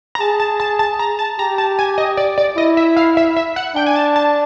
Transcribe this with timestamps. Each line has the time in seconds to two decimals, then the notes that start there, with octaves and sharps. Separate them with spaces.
0.15 A#5
0.21 G#4 A5
0.40 A5
0.60 A5
0.79 A5
0.99 A#5
1.19 A5
1.39 G4 A#5
1.58 A5
1.79 G#5
1.98 D#5
2.17 D5
2.38 D5
2.57 E4 D#5
2.77 E5
2.96 F5
3.17 E5
3.37 E5
3.56 F#5
3.75 D4 G5
3.86 G#5
3.96 A5
4.16 A5